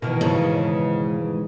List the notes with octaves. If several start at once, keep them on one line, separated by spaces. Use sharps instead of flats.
B2 D#3 E3 F#4 A#4
G#2 C#3 C#5 A5